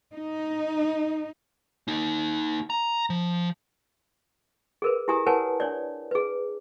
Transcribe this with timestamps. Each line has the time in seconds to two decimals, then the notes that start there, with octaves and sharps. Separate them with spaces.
0.15 D#4
1.88 A#3 D#4
2.70 A#5
3.10 F3
4.82 G#4 A#4 B4
5.08 E4 G4 G#5 A#5 D#6
5.27 A#4 B4 C#5 F#5 G#5 A5
5.60 D4 C#5 D5
6.11 G#4 B4